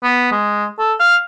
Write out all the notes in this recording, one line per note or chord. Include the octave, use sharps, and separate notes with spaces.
B3
G#3
A4
F5